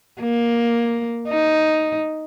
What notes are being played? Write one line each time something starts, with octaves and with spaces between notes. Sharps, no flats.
A#3
D#4